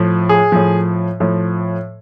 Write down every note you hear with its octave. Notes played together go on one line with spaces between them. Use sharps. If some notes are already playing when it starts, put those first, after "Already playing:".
Already playing: A2 F3
G#4
A2 F3
A2 F3